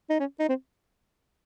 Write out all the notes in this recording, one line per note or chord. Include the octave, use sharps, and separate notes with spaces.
D#4
C#4
D#4
C4